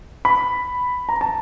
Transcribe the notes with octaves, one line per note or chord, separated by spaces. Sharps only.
B5
A#5
A5